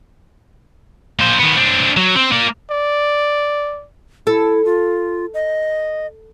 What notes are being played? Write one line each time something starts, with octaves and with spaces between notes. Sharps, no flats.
A#2 C5
D#3 B3
C4 D4
F#3
C4
A#3 D5
D5
E4 A4
F4
D#5